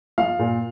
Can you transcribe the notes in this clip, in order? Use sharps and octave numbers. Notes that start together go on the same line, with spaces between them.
F3 F5
A#2